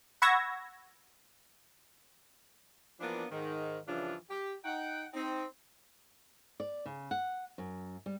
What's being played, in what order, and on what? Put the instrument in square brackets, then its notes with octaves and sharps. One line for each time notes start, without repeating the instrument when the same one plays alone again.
[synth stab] F#5 B5 C#6 E6 G#6 A#6
[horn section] E3 F3 A#3 B3 D4
G#2 D#3
G2 C#3 E3 F3 D4 F4
G4
D#4 F#5 G5
C4 D#4
[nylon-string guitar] D5
C#3
F#5
F#2
G3